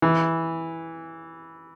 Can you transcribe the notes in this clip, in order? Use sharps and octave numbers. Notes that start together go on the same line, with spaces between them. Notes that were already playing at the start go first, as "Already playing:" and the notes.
E3